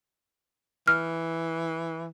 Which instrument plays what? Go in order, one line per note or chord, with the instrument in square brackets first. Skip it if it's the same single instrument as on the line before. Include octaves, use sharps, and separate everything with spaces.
[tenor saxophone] E3 [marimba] F6